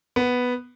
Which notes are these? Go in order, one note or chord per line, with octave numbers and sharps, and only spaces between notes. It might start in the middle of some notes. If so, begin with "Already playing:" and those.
B3